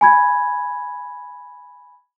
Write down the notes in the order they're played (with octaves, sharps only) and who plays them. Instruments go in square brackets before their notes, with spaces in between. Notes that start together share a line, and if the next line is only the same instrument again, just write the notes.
[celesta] G#5 B5 G#6